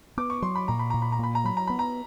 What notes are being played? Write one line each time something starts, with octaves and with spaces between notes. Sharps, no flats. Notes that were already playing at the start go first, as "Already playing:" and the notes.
B3 D6
C#6
F#3 C6
B5
A#2 A#5
B5
A#2 A#5
B5
A#5
A#2 B5
A#5
F#3 B5
A#5
B3 B5
A#5